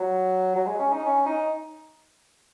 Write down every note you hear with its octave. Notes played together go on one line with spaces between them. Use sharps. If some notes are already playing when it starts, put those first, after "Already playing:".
Already playing: F#3
F#3
G#3
C#4
D#4
C#4
D#4